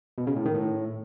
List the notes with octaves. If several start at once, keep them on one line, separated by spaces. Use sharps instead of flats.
B2
C#3
A2
D#3
A2